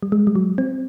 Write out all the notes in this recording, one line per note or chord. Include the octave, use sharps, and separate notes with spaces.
G3
G#3
G3
F#3
C4